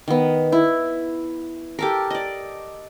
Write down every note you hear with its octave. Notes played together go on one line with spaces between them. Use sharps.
D#3 B3
E4
G4 A4 A#4
D5 D#5